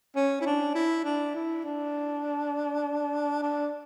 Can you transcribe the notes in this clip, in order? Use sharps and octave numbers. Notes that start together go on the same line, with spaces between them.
C#4
E4
D4
E4
D4
E4
D4
D4